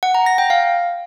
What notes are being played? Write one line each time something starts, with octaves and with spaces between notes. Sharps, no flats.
F#5
A#5
A#6
G5
F5